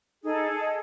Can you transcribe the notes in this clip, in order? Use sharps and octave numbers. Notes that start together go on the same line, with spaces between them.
D#4 G#4 A4
D#5